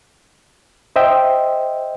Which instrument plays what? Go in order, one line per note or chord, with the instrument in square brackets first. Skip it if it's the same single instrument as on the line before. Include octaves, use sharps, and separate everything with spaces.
[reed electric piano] C5 D#5 E5 G5